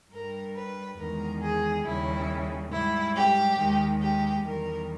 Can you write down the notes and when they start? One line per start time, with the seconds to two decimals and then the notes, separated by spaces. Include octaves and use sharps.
0.12 G2 G3 A#4
0.55 B4
0.98 E2 D#3 G#3 A#4
1.42 G#4
1.85 D#2 C#3 G3 E4
2.72 G#2 G3 E4
3.15 G4
3.58 D#2 D#3 G#3
4.01 G4
4.45 E2 D#3 G3 A#4